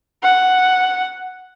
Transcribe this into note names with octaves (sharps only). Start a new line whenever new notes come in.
F#5